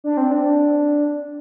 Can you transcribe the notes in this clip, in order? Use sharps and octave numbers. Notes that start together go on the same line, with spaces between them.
D4
C4
D4